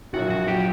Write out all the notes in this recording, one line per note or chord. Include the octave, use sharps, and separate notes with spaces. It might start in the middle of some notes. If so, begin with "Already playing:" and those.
A#1 A#2 F#3 F#4
F#4
A#2 F#3 G4